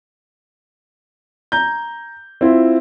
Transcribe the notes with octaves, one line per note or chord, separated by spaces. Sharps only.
A#5 G6
C4 E4 F4